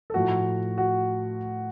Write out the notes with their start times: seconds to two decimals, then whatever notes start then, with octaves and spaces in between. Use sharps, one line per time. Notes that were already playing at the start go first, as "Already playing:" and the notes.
0.10 A4
0.14 A2 F3 A3 F#4
0.78 F#4